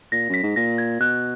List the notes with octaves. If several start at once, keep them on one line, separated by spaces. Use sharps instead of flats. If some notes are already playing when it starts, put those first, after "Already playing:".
A#2 A#6
F#2 B6
G#2
A#2 A#6
G#6
B2 F#6